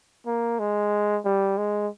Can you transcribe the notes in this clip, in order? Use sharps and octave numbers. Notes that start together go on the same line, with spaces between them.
A#3
G#3
G3
G#3